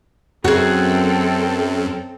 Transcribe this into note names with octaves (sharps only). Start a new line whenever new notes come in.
F#2 C4 F#4 G#4 A4